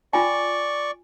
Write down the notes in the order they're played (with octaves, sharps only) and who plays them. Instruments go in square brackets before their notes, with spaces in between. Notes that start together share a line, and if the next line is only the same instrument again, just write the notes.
[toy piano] F4 G5 G#5 [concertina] D5 C#6